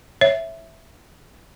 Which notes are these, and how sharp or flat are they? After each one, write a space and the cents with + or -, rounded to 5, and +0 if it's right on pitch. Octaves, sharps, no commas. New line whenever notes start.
C#5 -20 E5 +0